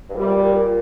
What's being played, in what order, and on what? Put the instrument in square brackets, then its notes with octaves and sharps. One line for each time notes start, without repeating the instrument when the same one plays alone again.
[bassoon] G2
[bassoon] A#2 [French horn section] G3
[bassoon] C3
A#2
A#2
A#2
A#2